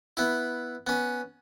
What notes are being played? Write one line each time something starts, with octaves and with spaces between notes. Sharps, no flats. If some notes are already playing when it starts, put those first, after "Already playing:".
B3 E4
B3 C#4